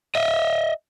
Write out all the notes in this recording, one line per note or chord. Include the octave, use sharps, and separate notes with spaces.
D#5 E5